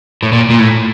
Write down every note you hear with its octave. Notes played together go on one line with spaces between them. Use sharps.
A2
A#2
A#2
A2